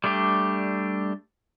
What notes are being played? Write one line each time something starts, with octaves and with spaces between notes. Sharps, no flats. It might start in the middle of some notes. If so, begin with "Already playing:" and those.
G3 A3 D4 G4